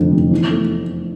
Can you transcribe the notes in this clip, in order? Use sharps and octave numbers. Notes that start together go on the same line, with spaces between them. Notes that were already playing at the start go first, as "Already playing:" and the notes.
Already playing: F1 F2 D3
F1
E2
A3